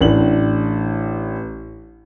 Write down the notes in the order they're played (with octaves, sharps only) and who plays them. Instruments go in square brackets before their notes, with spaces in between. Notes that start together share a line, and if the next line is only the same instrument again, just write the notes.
[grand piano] A1 A2 D4 F#7